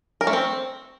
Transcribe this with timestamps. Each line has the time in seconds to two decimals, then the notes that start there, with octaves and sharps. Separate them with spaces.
0.21 A#4
0.27 A3
0.33 C4